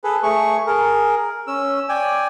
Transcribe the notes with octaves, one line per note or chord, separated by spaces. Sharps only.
G#4 A4 B4
A3 G#4 C#6
G#4 A#4
C#4 E6
D5 G5 G#5